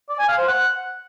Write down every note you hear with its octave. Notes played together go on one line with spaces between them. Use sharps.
D5
G#5
F5
C5
F#5